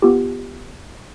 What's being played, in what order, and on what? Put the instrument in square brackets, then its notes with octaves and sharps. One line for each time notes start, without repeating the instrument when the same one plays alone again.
[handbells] B3 F4 G4